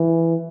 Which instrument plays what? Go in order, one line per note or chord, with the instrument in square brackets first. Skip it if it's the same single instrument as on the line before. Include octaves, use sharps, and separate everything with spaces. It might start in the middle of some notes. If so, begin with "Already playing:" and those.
Already playing: [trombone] E3